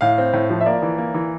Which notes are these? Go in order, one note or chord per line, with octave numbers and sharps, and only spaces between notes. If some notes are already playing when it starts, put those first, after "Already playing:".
A2 F5
C4
A2
F3
E5
A#3 D5
E3
A#3
E3